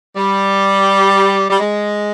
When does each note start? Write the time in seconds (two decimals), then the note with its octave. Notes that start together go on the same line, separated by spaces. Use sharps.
0.17 G3
1.49 G3
1.59 G#3